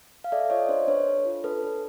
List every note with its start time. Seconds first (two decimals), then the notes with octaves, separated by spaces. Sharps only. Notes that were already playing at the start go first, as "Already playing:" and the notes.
0.24 F5
0.32 A4 D5 E5
0.50 F4 C#5 D#5
0.69 D4 C5 D5
0.88 D4 B4 C#5
1.07 A4
1.25 F4
1.44 D4 A4 B4
1.63 D4